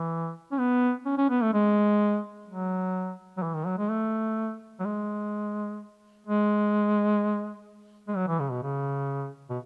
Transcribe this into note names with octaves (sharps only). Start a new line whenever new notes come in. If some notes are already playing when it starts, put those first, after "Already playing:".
Already playing: E3
C#4
B3
C#4
C#4
B3
A3
G#3
F#3
F#3
E3
D#3
F#3
G#3
A3
F#3
G#3
G#3
G#3
F#3
E3
C#3
B2
C#3
B2